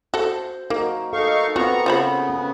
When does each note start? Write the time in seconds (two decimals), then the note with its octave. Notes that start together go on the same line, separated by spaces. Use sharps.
0.14 F#4 A4 C5
0.70 A#3 D#4 F#4 A#4
1.13 D#4 A4 F5 C#6
1.56 B3 C4 F4 F#4 A#5 C#6
1.86 C#3 B3 F4 C5 B5
2.30 C#4